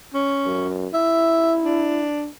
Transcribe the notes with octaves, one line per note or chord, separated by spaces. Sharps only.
C#4
F#2
E4 E5
D4